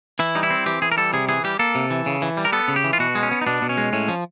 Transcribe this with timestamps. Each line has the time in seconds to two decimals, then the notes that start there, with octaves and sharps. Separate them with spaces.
0.19 E3 E4
0.35 G3 D#4
0.43 E4
0.50 C4
0.66 E3 G4
0.82 E3 G#4
0.92 A#4
0.97 G3 A4
1.13 C3 G#4
1.29 E3 G#4
1.44 G3 G4
1.59 A#3 A4
1.75 C3
1.91 E3
2.06 C#3
2.22 E3
2.37 G3
2.45 A#4
2.52 B3 A4
2.68 C#3
2.76 G4
2.84 E3
2.93 F4
2.99 B2 F#4
3.15 G#3
3.23 C#4
3.31 B3
3.41 D#4
3.46 B2 D4
3.62 B2
3.69 C#4
3.77 G#3
3.93 A2 C#4
4.08 F3